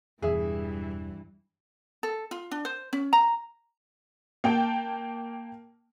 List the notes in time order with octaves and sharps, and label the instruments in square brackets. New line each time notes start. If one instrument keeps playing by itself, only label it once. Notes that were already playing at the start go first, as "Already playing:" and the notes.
[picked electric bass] E1 E2 B2 [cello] G2 E3 [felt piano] G#4 E5
[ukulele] A4
F4
D4
C5
C#4
A#5
[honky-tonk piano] A#3 G5 A5